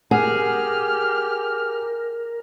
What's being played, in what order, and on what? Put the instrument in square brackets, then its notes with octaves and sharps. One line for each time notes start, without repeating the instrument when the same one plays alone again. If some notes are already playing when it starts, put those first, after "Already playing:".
[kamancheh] G4 F6 [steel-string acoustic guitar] G#4 [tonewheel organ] A#4 [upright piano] F#5